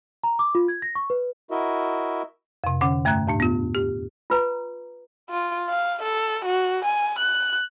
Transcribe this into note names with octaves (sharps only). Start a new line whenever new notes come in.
A#5
D6
F4
G#6
A#6
C#6
B4
E4 F#4 A#4 D#5 E5
F2 C3
D3 C#4 F#5
G2 A3 E5 A#5 F#6 G#6
E2 A2 D4
B3 F4
G4
F4 B4 A#5
F4
F5
A4
F#4
G#5
F#6